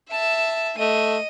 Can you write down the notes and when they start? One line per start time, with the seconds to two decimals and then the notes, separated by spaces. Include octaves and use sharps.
0.11 E5 A5
0.78 A3 D#5 D#7